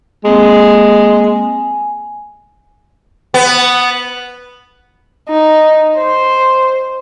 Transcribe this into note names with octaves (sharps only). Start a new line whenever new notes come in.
G#3 A#3 C4
G#5
B3
D#4
C5